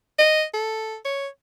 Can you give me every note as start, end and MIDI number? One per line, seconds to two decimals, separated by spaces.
0.19 0.44 75
0.54 0.96 69
1.05 1.27 73